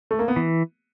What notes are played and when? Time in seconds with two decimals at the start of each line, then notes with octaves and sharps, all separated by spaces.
0.11 A3
0.19 A#3
0.28 B3
0.36 E3